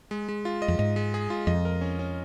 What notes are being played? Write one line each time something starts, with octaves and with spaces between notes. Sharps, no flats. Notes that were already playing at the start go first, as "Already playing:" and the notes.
G#3
G#3
F4
D#5
F2
G#2 D#5
G#3
G#4
F4
F2 D#5
A#4
C#4
C#4